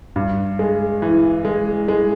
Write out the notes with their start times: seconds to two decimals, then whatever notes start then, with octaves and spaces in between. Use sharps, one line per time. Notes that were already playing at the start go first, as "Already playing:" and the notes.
0.16 G2
0.59 G#3
1.02 E3
1.45 G#3
1.88 G#3